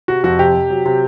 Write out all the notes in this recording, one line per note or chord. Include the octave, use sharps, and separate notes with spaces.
C3 F#4
F2 F#4
C3 G4
C3
F#3
C3